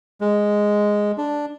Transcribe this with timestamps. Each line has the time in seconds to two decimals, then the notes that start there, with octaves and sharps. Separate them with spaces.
0.21 G#3
1.18 D4